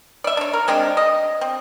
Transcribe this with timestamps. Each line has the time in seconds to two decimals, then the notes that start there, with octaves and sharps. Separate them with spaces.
0.24 D5 E5
0.37 D4 C#5
0.53 A#4
0.68 G#3 C4 D4 G4
0.97 D#5
1.41 C4